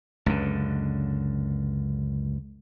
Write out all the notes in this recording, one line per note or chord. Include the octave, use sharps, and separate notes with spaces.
C#2 F#2 D3